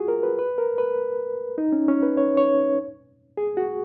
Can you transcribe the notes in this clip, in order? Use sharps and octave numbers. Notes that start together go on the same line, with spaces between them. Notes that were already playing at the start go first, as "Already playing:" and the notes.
Already playing: F4 F#4 G#4
A#4
B4
B4
A#4
B4
D#4
C#4
C#4
B4
C#5
C#5
G#4
F#4